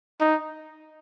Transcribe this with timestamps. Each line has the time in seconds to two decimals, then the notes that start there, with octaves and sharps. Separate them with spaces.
0.20 D#4